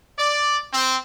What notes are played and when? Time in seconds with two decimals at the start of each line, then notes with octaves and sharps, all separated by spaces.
0.19 D5
0.74 C4